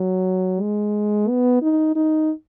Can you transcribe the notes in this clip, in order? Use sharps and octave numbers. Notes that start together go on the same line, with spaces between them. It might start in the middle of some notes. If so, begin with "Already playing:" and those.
Already playing: F#3
G#3
B3
D#4
D#4